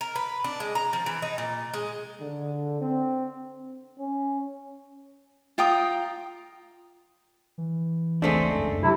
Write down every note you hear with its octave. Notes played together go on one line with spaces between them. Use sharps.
A#4
B4
D4
G#3
A#5
F3
E3
D#4
A#2
G#3
D3
C4
C#4
F4 G5 A#5 D#6
E3
F1 C#2 G#3 A3 C4 D4
F#2
C3 F#3 E4